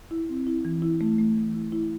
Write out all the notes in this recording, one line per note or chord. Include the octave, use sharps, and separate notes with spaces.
E4
C4
E4
E3
E4
A3
A3
E3
E4
E4